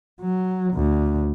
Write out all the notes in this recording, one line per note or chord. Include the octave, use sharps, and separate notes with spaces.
F#3
D2